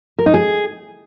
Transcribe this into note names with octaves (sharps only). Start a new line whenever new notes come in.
A#4
D#4
G#4